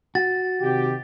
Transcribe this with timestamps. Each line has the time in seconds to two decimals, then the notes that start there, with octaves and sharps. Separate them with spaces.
0.15 F#4 A6
0.61 C3 D#3 G4